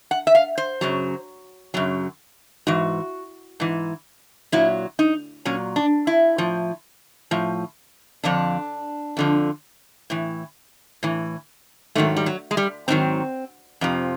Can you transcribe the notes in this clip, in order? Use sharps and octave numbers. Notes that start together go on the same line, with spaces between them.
F#5
E5
F5
C5
F#2 C#3 F#3
F#2 C#3 F#3
G#2 E3 F#4
G#2 E3
A#2 F#3 E4
D#4
A#2 F#3 C#4
D4
E4
A2 F3
A2 F3
F2 D3 F3 D4
F2 D3 F3
A2 E3
A2 E3
G#2 D#3 F#3 A3
G3
F#3
G#3
G3
G#2 D#3 F#3 C4
F2 C3 F3